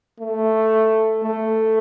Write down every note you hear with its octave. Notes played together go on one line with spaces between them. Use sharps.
A3
A3